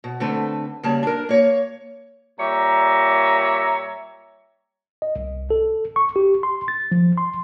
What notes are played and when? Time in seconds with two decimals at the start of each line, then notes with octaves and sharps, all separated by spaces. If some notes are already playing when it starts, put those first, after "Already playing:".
0.04 B2
0.20 D3 A3 C4 B4
0.83 C#3 G3 A#3 A5
1.03 D4 A#4
1.29 A#3 C#5
2.39 A#2 G3 C#5 E5 A#5
5.02 D#5
5.16 C2
5.50 A4
5.96 C#6
6.16 G4
6.43 C6
6.68 A6
6.92 F3
7.17 C6